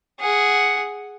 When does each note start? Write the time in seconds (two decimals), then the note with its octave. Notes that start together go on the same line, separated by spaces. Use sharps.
0.20 G#4 F#5